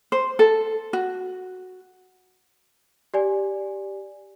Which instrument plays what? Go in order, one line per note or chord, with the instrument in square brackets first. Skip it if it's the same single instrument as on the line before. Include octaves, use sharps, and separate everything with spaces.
[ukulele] C5
A4
F#4
[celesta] G4 D5 G#5